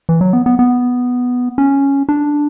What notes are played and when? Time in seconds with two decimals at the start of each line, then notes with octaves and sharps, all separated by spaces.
0.09 E3
0.21 F#3
0.33 B3
0.46 B3
0.59 B3
1.58 C#4
2.09 D4